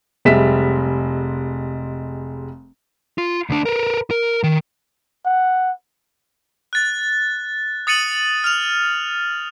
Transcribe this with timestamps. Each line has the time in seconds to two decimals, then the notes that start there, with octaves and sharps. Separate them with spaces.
0.25 F1 G3 G#3 E5 B6 E7
3.18 F4
3.50 D2 D4
3.65 A#4 B4
4.11 A#4
4.43 D#3
5.25 F#5
6.73 F#6 A6
7.87 D#6 A6 C#7 D#7 F#7
8.44 F6 F7